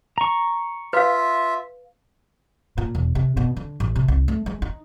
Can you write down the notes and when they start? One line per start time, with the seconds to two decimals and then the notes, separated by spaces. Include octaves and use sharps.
0.18 A#5 C#6
0.93 F4 B4 E5 F5
2.78 A#2
2.95 E1
3.15 C3
3.37 B2
3.57 D3
3.80 A1
3.96 C3
4.08 C2
4.28 A3
4.46 G#3
4.62 D#4